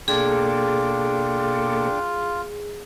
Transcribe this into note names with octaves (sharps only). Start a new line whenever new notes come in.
B2 A#3 D4 F4 G#4 A4 G5 D6